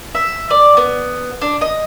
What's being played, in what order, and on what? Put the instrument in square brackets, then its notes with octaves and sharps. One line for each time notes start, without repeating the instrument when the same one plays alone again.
[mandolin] E5
D5
B3
D4
D#5